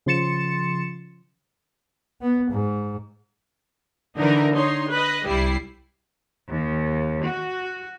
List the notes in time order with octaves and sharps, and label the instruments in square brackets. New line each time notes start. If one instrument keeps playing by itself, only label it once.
[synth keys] C#3 F3 C6 A6 C#7 E7
[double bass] B3
G#2
[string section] D3 E3 D#4 A#4
D#4 C#5 C6
B4 D#5
C2 G3 E4 C7
D#2
F#4